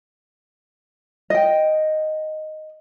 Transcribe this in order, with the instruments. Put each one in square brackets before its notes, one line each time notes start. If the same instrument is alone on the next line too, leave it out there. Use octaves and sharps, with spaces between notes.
[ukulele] D#5 G5